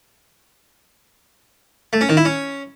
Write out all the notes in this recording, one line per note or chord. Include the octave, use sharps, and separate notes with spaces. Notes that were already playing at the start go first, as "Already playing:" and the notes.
A3
C#4
D#3
E4
C#4